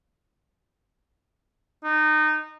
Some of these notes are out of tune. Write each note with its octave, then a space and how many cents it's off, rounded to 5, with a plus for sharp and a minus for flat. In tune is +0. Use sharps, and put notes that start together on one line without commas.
D#4 -25